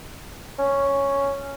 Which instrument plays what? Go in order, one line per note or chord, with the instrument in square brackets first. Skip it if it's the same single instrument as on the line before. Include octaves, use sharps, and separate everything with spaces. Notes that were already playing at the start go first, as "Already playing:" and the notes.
[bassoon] C#4